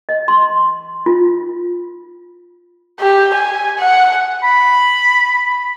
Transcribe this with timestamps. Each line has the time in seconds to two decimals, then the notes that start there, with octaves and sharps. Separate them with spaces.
0.09 D#5
0.28 C6
1.06 F4
3.00 G4
3.34 G#5
3.79 F#5
4.43 B5